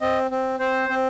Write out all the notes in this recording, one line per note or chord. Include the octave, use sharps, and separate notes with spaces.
C4 D#5
C4
C4 C5
C4